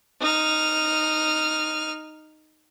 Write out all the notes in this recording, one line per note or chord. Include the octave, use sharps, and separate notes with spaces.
D#4 F6